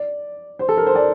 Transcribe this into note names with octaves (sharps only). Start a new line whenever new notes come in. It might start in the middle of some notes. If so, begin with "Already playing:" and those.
Already playing: D5
C5
A4
A#4
C5
D5